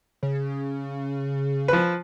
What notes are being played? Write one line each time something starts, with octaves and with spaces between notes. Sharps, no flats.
C#3
F3 B4